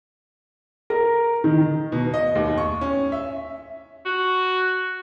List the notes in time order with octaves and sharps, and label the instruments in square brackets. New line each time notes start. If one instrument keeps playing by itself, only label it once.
[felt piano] A#4
D#3
[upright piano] B2
D#5
D#2
C#6
C#4
E5
[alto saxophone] F#4